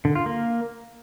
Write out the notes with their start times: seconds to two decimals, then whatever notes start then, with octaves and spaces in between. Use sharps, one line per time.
0.05 D3
0.15 F4
0.26 A#3